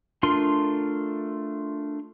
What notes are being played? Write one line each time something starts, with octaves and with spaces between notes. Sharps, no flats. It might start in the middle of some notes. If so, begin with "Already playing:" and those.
A3 D4 F4 A#4 C6